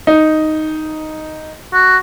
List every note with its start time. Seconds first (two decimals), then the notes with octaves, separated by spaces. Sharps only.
0.07 D#4
1.74 F#4